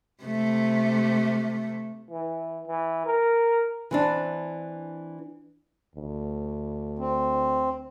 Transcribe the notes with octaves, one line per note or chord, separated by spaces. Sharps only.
C3 A3
E3
E3
A#4
E3 C4 D4
D2
C4